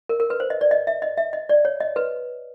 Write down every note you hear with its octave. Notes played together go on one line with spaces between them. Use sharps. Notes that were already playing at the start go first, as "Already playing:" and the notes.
A#4
A#4
B4
C5
D#5
D5
D#5
E5
D#5
E5
D#5
D5
C#5
D#5
B4